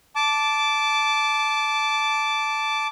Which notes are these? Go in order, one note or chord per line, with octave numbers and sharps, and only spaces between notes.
A5 D6